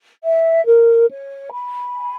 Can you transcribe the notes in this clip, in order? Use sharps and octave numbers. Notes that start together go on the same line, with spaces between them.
E5
A#4
C#5
B5
G#5